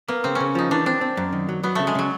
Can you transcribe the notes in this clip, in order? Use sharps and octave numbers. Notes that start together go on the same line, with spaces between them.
A#3 B3
C#3 C4
C#3 C#4
F3 D#4
E3 D4
C4 D4
C4
F#2
D#3
F#3
F#3 B3
C#3 A3
G#3
C#3 F#3